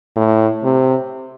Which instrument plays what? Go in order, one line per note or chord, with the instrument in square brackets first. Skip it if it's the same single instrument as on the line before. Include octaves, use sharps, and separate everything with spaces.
[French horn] A2
C3